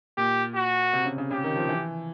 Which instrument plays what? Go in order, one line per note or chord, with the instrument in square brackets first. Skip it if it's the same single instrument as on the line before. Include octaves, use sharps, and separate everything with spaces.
[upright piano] A#2 [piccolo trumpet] G4
[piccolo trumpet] F#4
[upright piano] C3
C#3
C#3
[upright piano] C#3 [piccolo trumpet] G4
[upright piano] D#3
F3
E3